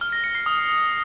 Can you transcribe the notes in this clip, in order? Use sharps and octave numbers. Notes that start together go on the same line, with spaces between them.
F6
A#6
C#7
C7
D#6